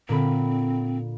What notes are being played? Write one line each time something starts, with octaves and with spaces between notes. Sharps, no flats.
A#2 D3 C4 B5